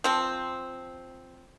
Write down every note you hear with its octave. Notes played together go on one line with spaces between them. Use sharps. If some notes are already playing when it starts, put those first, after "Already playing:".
F3 C4